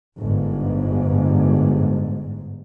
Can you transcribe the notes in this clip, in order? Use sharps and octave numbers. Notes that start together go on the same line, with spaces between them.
G1 G#2